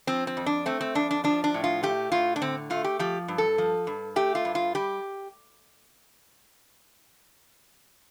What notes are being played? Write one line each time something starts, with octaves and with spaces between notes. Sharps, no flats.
F3 C4
C4
F2
D4
A3 C4
C4
F2 D4
D4
F3 D4
D4
A2
F4
A3 G4
A2 F4
D4
D3 C4
A3 F4
G4
F3 G4
G2
A4
F3
G2
A3 G4
F4
G2
F4
G3 G4